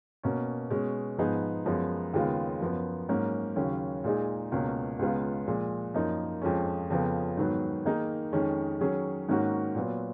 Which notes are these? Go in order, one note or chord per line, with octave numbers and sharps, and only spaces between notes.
B2 A#3 C#4
B2 G#3 C#4
G#2 F3 B3 D#4 G#4
F#2 F3 G#3 B3
D#2 C#3 G#3 B3 F4
F#2 F3 B3
G#2 F#3 A#3 C#4
D#2 C#3 F#3 C#4
A#2 G#3 D#4 G#4
C#2 B2 A#3 C#4
C#2 C#3 G#3 B3 F4
A#2 F3 G#3
F#2 F3 A#3 D#4
F2 F3 G#3 C#4
F2 C#3 F3 B3
G#2 D#3 F#3 B3
D#3 A#3 D#4 G#4
F2 D#3 G#3 C#4
D#3 F#3 C#4 G#4
G#2 D#3 A#3 C#4 F#4
A#2 F#3 B3